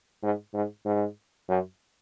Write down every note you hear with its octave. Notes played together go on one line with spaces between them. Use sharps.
G#2
G#2
G#2
F#2